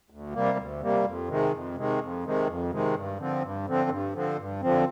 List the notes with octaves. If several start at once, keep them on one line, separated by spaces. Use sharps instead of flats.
D2
C3 G3 A#3
D2
C3 G3 A#3
F2
C3 D#3 G#3
F2
C3 D#3 G#3
F2
C3 D#3 G#3
F2
C3 D#3 G#3
G2
D3 F3 C4
G2
D3 F3 C4
G2
D3 F3 C4
G2
D3 F3 C4